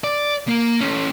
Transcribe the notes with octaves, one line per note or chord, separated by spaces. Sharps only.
D5
A#3
A3 C#4